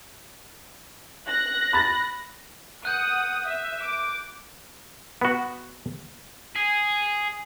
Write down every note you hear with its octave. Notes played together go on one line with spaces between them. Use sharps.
F#6 A#6
B5 A6
F#5 D#6 F#6 G6 D#7
E5
D6
B3 F#4
G#4